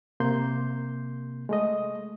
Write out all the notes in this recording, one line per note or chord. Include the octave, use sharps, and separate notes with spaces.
C3 A#3 C6 G6
G#3 A3 D#5